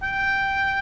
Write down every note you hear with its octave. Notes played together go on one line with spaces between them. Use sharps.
G5